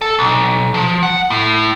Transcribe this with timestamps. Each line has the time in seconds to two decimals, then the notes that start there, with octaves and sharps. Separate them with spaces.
0.01 A4
0.19 B1
0.74 F3
1.03 F#5
1.30 A2